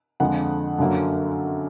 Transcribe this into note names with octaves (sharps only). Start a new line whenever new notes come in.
F2 D3 F3 G#3 F#5
F#2 D3 F#3 A#3